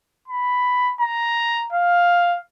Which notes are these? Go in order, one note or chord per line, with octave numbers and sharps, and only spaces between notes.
B5
A#5
F5